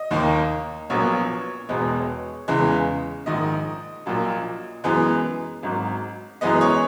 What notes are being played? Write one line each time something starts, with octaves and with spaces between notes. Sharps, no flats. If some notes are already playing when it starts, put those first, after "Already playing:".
Already playing: D#5
D#2 D#3 A#3
A#1 A#2 F#3 B3 C#5
E1 E2 B2 G#3 B3
E2 C#3 E3 G#3
A#1 G#2 D#3 D#5
A#1 A#2 F#3
F#2 E3 G#3 B3
G#1 G#2 F#3
F#2 E3 G#3 B3 D#5
C#5